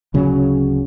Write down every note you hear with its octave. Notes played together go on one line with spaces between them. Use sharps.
D1 C#3 F#3 C#4